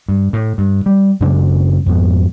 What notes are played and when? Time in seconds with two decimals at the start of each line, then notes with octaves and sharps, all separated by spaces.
0.08 G2
0.33 A2
0.58 G2
0.86 G3
1.21 F#2 C#3 G#3 D4
1.86 F2 G#2 B3